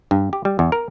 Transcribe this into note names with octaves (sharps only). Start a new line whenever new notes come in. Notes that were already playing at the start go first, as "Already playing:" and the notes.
G2
G4
G3
E2
A#4